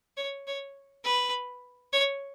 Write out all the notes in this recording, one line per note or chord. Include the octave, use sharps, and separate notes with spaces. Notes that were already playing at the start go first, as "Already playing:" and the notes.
C#5
C#5
B4
C#5